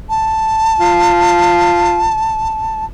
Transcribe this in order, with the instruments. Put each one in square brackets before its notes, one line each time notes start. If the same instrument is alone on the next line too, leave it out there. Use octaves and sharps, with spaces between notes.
[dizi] A5
[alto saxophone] F4